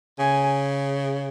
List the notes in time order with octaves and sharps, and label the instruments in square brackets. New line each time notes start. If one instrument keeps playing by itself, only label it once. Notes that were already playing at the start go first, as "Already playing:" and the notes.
[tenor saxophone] C#3 [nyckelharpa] G#5